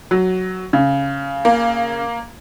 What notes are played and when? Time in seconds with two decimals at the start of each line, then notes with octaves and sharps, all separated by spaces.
0.11 F#3
0.73 C#3
1.45 A#3